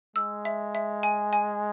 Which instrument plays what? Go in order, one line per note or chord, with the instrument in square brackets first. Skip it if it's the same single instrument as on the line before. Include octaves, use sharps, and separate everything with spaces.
[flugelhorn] G#3 [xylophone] E6
[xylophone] E5
E5
G#5
G#5